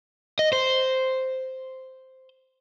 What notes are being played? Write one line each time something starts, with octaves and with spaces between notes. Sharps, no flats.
D#5
C5